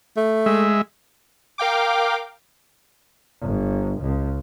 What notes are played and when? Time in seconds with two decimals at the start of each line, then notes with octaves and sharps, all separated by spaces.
0.17 A3
0.46 G#3 E5
1.58 A#4 F5 G5 D6
3.42 G1
4.02 C#2